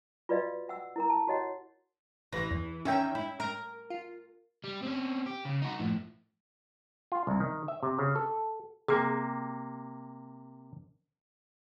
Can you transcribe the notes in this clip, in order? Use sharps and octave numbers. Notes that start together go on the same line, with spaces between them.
F4 F#4 B4 D5 D#5 F5
E5 F#5 E6
E4 A#4 A#5
A5
F#4 G4 C#5 D#5 F#5
A1 E3 B4 A#6
E2
E2 D#3 C#4 E5 G5
E4
A#4
F4
G3
C4 C#4
G4
C#3
D#4 F#4
A2 F3
F4
C2
D#3
E5
C3
C#3
A4
C3 A#3 G#4